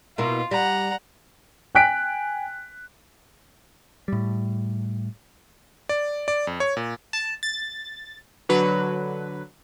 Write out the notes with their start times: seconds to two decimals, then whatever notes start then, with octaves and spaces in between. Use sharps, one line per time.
0.18 B2 A#3 E4 F4
0.51 G3 F#5 A#5
1.75 G5 G#5 F#6 B6 D7
4.08 A2 G3
5.89 D5
6.28 D5
6.47 F2
6.60 C#5
6.77 A#2
7.13 A5
7.43 A6
8.49 D3 F#3 B4